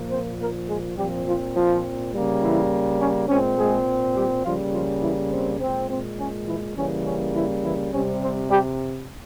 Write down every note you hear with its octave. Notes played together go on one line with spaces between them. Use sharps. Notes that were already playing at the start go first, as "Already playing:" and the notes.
Already playing: A#2 F3 A#3
C4 C5
A#3 A#4
G#3 G#4
A#2 F3 G3 C4 G4
F3 F4
F3 F4
C#3 G3 A#3
E3 E4
C#4
A#2 G#3 C4 C#4
G#3 G#4
G3 G4
C#3 F3 G3 A#3 F4
F3 F4
E3 E4
C4
A#2 G#3 C4
C4
C#4
E3 E4
C#3 E3 G3 A#3 C#4
C#4
E3 E4
E3 E4
C3 G3 C4 C#4
C4
G3 G4